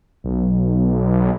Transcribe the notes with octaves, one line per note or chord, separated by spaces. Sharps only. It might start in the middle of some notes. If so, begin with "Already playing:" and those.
B1